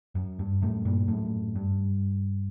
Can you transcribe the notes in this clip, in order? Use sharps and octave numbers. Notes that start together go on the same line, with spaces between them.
F#2
G2
F#2 A2
G2 A#2
F#2 A2
G2